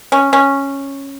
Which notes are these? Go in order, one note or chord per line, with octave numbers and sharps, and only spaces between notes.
C#4
C#4